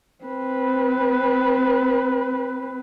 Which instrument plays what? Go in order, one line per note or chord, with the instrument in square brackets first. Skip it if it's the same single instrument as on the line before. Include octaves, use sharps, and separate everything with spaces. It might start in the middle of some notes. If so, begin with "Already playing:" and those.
[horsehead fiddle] C4 B4